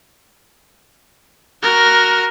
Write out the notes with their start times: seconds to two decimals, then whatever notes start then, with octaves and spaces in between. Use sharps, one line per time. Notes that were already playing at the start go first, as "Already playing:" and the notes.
1.63 F#4 A#4